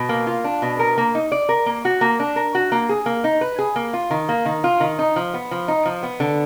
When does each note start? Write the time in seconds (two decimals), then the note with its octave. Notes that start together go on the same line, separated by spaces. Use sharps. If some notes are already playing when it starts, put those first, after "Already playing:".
Already playing: B2
0.09 A#3
0.27 F4
0.44 D4
0.62 B2
0.79 A#4
0.98 A#3
1.15 D#4
1.32 D5
1.49 A#4
1.66 A#3
1.85 F#4
2.01 A#3
2.20 D4
2.36 A#4
2.55 F#4
2.72 A#3
2.89 G#4
3.06 A#3
3.24 D#4
3.41 B4
3.59 G#4
3.76 A#3
3.94 F4
4.11 D#3
4.29 A#3
4.45 D#3
4.64 F4
4.80 D#3
4.99 D#4
5.16 F3
5.34 B3
5.51 F3
5.68 D#4
5.86 F3
6.03 B3
6.20 D3